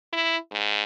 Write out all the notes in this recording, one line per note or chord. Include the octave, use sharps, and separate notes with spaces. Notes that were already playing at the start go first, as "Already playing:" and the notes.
E4
G#2